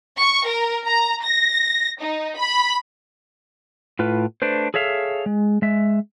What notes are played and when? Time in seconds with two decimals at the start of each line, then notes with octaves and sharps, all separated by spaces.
0.19 C#6
0.48 A#4
0.87 A#5
1.24 A#6
2.01 D#4
2.37 B5
3.99 A2 F4 B4
4.42 A3 D4 B4 C5
4.74 G#4 A4 C#5 E5 F5
5.26 G#3
5.62 G#3 E5